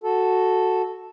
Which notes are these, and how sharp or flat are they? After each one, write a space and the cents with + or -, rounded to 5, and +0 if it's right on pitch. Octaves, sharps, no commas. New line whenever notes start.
F#4 +0 A4 -5